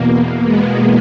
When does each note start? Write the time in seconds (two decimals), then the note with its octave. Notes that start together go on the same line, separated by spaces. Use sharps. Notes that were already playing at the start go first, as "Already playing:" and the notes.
Already playing: E2 B2 A#3
0.17 A#3
0.45 G#3 B3